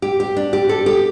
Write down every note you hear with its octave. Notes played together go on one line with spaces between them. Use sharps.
G4
G4
D4
G4
A4
G4